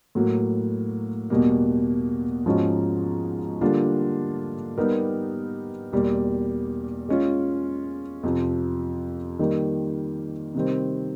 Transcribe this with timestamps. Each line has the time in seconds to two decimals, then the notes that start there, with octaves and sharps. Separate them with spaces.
0.15 A2 F#3 A#3
1.30 E2 B2 G3 A#3
2.46 G#2 F3 G#3 C#4 F#4
3.61 D3 G3 A#3 D4 F4
4.78 G3 B3 D#4 G4 A#4
5.92 E2 B2 G3 A#3
7.09 G#3 C#4 F4
8.23 F2 C3 F3
9.39 D#3 G3 A#3
10.55 C3 D#3 G3 C4